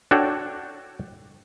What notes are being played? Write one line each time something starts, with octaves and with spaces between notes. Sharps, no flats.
D4 F#4 A4 C#5 G5